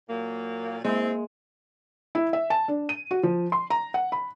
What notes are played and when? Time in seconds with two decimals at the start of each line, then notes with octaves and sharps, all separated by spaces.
0.08 A#2 F#3 A#3
0.85 G#3 A#3 C4 E4
2.15 E4
2.33 E5
2.50 A5
2.68 D4
2.89 D#7
3.11 F#4
3.23 F3
3.52 C6
3.70 A#5
3.94 F#5
4.12 B5